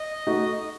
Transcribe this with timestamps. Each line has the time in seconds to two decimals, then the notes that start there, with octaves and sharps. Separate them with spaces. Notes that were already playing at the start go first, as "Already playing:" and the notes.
Already playing: D#5
0.27 A3 D#4 F#4